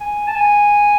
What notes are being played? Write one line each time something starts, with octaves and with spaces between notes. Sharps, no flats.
G#5
A5
G#5